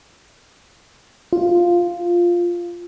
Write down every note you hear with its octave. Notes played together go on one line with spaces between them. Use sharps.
F4